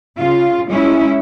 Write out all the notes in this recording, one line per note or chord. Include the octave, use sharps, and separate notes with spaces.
C#3 F4
G#3 C#4 E4